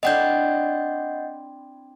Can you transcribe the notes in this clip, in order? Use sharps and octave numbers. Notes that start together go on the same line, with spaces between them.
C4 D4 E4 D#5 F#5 G6